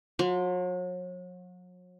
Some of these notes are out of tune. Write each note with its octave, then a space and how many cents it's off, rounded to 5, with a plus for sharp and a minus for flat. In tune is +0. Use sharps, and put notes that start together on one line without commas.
F#3 -40 C6 +0